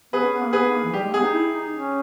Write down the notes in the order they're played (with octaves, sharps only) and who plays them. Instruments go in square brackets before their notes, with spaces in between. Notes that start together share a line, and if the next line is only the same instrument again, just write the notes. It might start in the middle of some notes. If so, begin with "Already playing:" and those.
[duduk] B3 [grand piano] G#4 B4
[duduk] C#4
B3
A#3
[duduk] B3 [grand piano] G#4 B4
[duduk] B3
A#3
E3
[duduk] G3 [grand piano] G4
[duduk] G#3
[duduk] B3 [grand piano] G#4
[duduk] D#4
E4
D#4
C#4